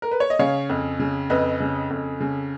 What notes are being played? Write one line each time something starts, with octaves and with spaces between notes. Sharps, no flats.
A#4
B4
C#5
D#5
C#3 C#5 F5
F2
C#3
F2 B4 D#5
C#3
F2
C#3